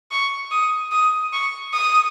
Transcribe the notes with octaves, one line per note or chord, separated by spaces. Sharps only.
C#6
D#6
D#6
C#6
D#6